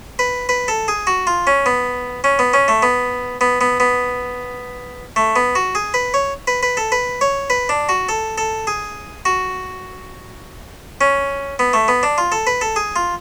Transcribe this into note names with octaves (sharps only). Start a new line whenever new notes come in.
B4
B4
A4
G#4
F#4
F4
C#4
B3
C#4
B3
C#4
A3
B3
B3
B3
B3
A3
B3
F#4
G#4
B4
C#5
B4
B4
A4
B4
C#5
B4
D4
F#4
A4
A4
G#4
F#4
C#4
B3
A3
B3
D4
F4
A4
B4
A4
G#4
F4